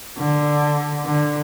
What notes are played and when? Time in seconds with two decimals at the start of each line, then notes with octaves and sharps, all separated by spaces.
0.18 D3
1.06 D3